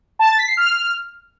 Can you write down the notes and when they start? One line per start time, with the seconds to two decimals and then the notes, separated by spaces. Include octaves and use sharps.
0.19 A5
0.29 A6
0.38 B6
0.48 C7
0.57 F6